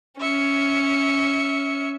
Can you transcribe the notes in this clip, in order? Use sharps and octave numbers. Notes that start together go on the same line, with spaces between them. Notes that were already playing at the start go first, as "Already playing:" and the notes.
C#4 E5 C#7